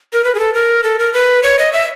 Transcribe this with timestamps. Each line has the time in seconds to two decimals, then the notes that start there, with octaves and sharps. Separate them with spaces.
0.13 A#4
0.24 B4
0.35 G#4
0.39 A4
0.54 A#4
0.84 A4
0.99 A#4
1.13 B4
1.43 C#5
1.59 D#5
1.73 E5